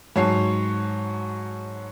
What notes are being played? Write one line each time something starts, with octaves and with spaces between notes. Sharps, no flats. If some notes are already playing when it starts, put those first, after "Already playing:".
G#2 F#3 C#5 A5 C7